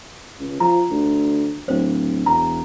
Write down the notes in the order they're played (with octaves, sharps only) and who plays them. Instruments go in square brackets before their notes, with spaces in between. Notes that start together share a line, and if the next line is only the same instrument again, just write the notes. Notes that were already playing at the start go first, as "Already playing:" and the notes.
[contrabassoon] C#2
[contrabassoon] F3 [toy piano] A#5
[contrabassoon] D2
[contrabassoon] D1 [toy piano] C5
[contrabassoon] E1 [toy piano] A#5